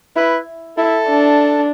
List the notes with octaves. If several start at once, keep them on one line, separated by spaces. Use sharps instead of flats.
E4 B4
E4 A4
D4